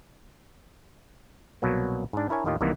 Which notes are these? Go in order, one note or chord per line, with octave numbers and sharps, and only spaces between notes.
C2 B2 F#3 A#3
G#2 D4
D4 E4 A#4 C#5 G#5
D#2 A2 D#3 F4 G4 D#5
C2 C3 D#3 E3 A#3 B3